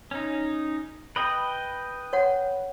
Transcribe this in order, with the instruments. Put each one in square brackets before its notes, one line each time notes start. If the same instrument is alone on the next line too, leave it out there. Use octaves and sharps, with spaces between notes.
[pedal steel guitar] C#4 D#4
B4 D#5 G5
[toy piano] C#5 F#5